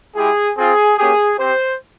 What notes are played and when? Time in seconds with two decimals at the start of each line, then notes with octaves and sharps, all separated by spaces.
0.16 G#3 E4 G4 G#4
0.57 C4 F4 G#4
0.97 A#3 C#4 G4 G#4
1.39 C4 G4 C5